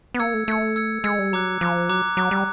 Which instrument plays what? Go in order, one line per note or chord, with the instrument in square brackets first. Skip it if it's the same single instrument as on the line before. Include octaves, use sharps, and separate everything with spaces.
[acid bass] B3
[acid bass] A#3 [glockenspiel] E6 G#6 C#7
[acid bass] A3
[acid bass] A3 [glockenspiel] E6 G#6 C#7
[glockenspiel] E6 G#6 C#7
[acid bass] G#3 [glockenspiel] E6 G#6 C#7
[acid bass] G3
[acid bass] F#3 [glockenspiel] A#5 D6 F#6
[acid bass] F3 [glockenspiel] A#5 D6 F#6
[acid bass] F#3 [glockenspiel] A#5 D6 F#6
[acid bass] F#3 [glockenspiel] A#5 D6 F#6
[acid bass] G3